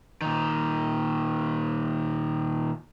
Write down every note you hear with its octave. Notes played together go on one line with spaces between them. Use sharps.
A#2 D#3